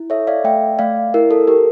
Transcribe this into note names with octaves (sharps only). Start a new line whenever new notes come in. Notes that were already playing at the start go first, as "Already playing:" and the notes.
Already playing: E4
A4 C#5 E5
D5 F5
A3 E5 G5
A3 D5 F5
E4 A#4
A4
G4 A#4